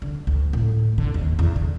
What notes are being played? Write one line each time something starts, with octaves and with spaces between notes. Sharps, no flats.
D3
D2
A2
D3
D#2
E2
D3